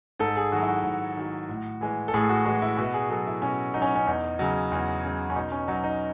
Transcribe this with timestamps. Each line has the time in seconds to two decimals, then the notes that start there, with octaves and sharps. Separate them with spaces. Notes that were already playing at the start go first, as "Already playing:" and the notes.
0.19 G#2 A4
0.36 G#4
0.52 D#3 F#3 F#4
0.62 E4
0.68 F#4
0.84 G#2
1.17 D#3 F#3
1.49 A2
1.81 E3 G#3
2.08 A4
2.14 A2 G#4
2.29 F#4
2.46 E3 G#3 F#4
2.62 E4
2.77 B2 F#4
2.94 G#4
3.10 F#3 A4
3.27 E4
3.42 B2 C#4
3.74 F#3 D#4
3.82 C#4
3.95 C#4
4.07 E2 D#4
4.39 C#3 F#3
4.72 E2
5.04 C#3 F#3
5.30 C#4
5.36 B2 D#4
5.52 C#4
5.68 F#3 D#4
5.84 D#4